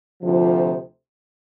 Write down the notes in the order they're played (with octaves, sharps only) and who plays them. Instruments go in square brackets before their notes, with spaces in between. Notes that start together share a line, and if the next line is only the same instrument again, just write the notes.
[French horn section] D2 C3 F3